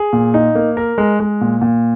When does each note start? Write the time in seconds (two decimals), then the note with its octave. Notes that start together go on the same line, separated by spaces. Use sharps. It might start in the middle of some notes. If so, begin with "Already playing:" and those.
Already playing: G#4
0.13 A#2
0.34 D#4
0.55 A#3
0.77 A#4
0.98 G#3
1.20 G#3
1.41 A#2
1.61 A#2